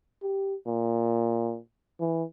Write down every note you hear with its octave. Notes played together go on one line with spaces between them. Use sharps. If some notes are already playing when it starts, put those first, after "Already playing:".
G4
A#2
E3